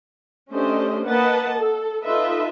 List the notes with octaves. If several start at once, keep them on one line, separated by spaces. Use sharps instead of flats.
A3 C#4 D4 G4 C5 D#5
A#3 B4 D#5 F#5 A5
A4
D#4 F4 A4 B4 D#5 E5